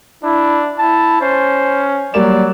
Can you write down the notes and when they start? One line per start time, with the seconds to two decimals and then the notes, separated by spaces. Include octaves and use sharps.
0.23 D4 E4
0.78 E4 A5
1.21 C#4 C5
2.14 F#3 G3 A#3 D5 E7